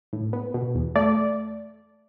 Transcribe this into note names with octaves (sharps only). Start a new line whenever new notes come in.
A2
B3
B2
E2
A3 D5